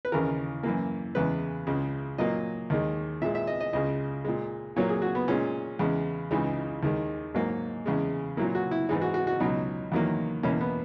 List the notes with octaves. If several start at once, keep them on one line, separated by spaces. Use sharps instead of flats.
B4
D#2 C#3 E3 A#4
F#2 E3 A#3
E2 C#3 G#3 B4
C#2 C#3 G#3
A#2 F#3 A#3 D#5
D#2 D#3 G#3
A#2 G#3 E5
E5
D#5
D#5
C#2 C#3 G#3 D#5
A#2 G#3
A#2 F#3 A#3 C#5
G#4
F#4
B3
A#2 G#3 C#4
E2 C#3 G#3
C#2 C#3 E3 G#3 D#4
D#2 D#3 G#3
G#2 F#3 A#3
E2 C#3 G#3
A#2 F#3 A#3 E4
F#4
E4
G#2 E3 G#3 D#4
F#4
F#4
F#4
C#2 B2 F#3 D#4
E2 D#3 F#3 A#3
E2 B2 A#3 C#4
B3